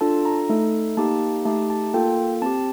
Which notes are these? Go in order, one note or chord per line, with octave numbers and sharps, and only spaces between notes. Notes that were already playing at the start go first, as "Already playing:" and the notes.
D4 F4 A4 A5
A#5
A3 D#4 A4
A#3 D#4 G4 A5
A3 D#4 G4 A5
A5
A#3 F4 A4 G5
C4 G4 A5